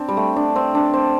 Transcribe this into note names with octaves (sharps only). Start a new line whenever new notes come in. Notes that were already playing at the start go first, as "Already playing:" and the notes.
Already playing: C4 D4
G3
A3
D4
C4
D4
C4